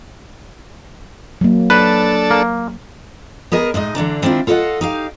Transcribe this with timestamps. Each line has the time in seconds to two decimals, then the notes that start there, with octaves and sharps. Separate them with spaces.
1.41 F#3 A#3
1.70 D4 A4 B4
2.31 A#3
3.52 B3 G#4 A#4 D#5
3.74 A2 G#3 D#4 D#5
3.95 D3 E3 D4 A#5
4.22 D#3 C4 D4 E4 F4
4.47 F4 A4 A#4 D5 D#5 F#5
4.81 D#4 G4 F5